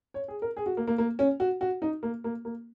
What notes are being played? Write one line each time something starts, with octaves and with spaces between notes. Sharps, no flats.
C#5
G#4
A#4
G#4
F#4
A#3
A#3
A#3
C#4
F#4
F#4
D#4
A#3
A#3
A#3